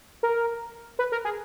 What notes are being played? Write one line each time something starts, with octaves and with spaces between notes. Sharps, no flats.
A#4
B4
A#4
G#4